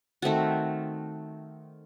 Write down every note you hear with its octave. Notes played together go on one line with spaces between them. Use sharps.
D#3 A3 C4 F#4